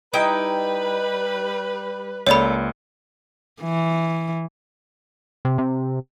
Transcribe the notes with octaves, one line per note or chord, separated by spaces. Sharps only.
G3 D#4 E4 B4 G5
C#2 A3 A#3 A4 C#5 D5 B5
E3
C3
C3